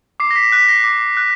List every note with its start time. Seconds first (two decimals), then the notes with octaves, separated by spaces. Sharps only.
0.20 D6 C7
0.31 A#6
0.36 B6
0.52 F#6 B6
0.69 A#6
0.84 D6
1.17 F#6